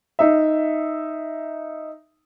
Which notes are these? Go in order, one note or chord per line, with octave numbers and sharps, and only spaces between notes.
D#4 E5